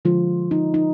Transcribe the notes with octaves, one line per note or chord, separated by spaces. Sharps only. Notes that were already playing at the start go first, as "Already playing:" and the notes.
D3 F3 G#3 F4
D#4
D#4